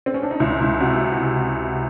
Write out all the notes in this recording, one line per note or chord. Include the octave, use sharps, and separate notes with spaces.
C4
C#4
D4
D#4
C#2 E4
C#2
C3 F#4